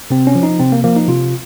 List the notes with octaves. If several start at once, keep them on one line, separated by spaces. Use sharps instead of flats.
C3 C4
C#4
F3
D#4
C3 C4
A#3
F3 A#3
D#4
C3 F4